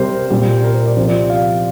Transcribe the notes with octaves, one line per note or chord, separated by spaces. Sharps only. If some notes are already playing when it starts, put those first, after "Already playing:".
Already playing: C3 G3 A#4 C5
A#2 G3
A#4
C5
D5
C3 F3 C5
D5
F5